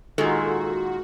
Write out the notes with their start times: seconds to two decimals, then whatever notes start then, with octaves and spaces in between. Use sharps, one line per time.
0.18 A#2 D#3 G#3 F#4 A4